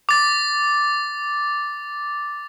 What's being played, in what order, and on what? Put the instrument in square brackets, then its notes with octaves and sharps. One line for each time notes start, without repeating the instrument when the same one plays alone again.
[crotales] D6 A6